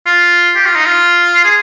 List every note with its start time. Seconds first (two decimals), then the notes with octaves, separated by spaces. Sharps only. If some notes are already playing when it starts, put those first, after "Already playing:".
0.06 F4
0.56 G4
0.66 F4
0.76 D#4
0.86 F4
1.44 G#4